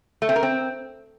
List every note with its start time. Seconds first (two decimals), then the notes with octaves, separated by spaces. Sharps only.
0.22 A3
0.29 C4
0.36 A#4
0.43 C4